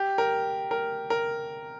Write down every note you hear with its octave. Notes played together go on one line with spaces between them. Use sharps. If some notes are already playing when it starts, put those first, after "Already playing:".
Already playing: G4
A#4
A#4
A#4